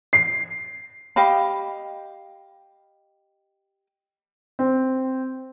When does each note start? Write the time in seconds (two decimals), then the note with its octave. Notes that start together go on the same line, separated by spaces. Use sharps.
0.13 C7
1.16 G4 D#5 F5 B5
4.59 C4